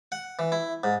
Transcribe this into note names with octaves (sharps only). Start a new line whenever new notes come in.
F#5
E3
E4
G#2